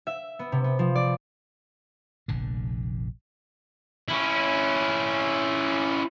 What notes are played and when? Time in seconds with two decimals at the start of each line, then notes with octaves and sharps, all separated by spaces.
0.07 E5
0.39 B3
0.52 C3
0.64 B3
0.79 F3
0.95 D5
2.28 F1 A#1 D3
4.08 C#4 E4